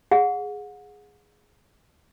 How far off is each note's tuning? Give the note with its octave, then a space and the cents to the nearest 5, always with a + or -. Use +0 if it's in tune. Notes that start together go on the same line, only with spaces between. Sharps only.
G#4 +0 F#5 -35